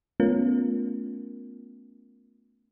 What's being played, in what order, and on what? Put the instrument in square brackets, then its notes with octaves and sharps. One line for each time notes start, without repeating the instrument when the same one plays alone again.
[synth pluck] A3 B3 C#4 F4 A#4